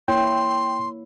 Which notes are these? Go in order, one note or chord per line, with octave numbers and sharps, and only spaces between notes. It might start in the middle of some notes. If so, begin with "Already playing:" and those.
A#3 E4 C#5 G5 C6